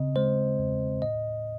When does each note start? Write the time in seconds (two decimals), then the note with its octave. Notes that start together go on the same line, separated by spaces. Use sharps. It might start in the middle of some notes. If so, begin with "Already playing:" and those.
Already playing: C#3 C4 D#5
0.16 G#3 C5
0.59 E2
1.02 A2 D#5